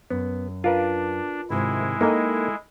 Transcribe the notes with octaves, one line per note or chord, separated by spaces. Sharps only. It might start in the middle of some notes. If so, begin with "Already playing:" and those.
F#2 B3
D4 F4 A#4 B4
G#2 C3 D#3 G#3 E4
A#3 D#4 A4 D#5 G5 G#5